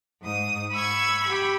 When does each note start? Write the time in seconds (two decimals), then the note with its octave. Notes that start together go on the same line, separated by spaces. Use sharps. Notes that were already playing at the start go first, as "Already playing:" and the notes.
0.22 G#2 D#6
0.72 B5 C#6 E6 G#6
1.24 G4 B5